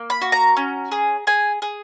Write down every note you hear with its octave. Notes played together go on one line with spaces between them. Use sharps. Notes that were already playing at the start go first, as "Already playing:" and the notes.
Already playing: A#3
B5
F#4
A#5
C#4
G#4
G#4 G#5
G#4